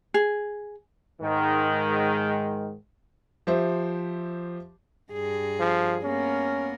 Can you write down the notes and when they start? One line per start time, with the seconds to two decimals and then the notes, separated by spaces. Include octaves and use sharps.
0.14 G#4
1.21 G#2 D#3 G#3
3.47 F3 G4 C5 E5
5.12 G2 G#4
5.60 F3
6.03 A#3 B3 C#4 A#4